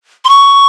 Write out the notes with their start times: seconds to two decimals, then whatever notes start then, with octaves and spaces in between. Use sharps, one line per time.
0.25 C6
0.29 C#6